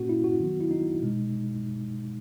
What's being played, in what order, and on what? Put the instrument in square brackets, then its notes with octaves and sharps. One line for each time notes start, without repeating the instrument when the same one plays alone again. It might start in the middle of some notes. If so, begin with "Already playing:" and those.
Already playing: [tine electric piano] A#2 A#3 C#4 F#4
E4
F#4
D#3 F#3 B3
E4
D#4
B2 G#3